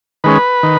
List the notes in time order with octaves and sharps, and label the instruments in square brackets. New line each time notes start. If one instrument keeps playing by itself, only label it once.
[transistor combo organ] D#3 G#3 C#4 B4
D#3